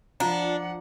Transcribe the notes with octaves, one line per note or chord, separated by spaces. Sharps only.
F3 D4 F4 F5 F#5 A#5